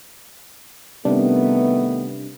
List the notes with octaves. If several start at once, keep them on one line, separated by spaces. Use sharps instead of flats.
C3 D#3 G3 A3 B3 D4